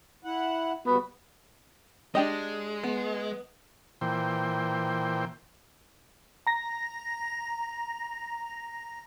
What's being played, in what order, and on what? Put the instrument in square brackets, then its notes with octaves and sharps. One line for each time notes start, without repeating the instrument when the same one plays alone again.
[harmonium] E4 F#5
[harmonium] C#3 G3 F#4 [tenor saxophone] B3
[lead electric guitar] G#3 [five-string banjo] D4 G4 D#5
[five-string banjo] B3
[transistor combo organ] A#2 E3 C5 G5
[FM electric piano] A#5 A#6